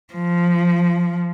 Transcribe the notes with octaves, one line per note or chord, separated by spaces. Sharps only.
F3